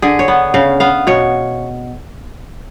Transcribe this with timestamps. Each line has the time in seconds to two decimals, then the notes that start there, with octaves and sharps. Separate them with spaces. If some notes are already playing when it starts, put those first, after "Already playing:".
0.02 D3 G#4
0.19 C#5
0.28 B3
0.54 C#3 F5
0.80 B3 F5
1.07 B2 C#5